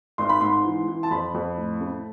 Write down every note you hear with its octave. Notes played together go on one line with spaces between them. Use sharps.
G#1 C6
B5
G#2 C6
E3
E3
A5
F2 B5
F2
A2
A3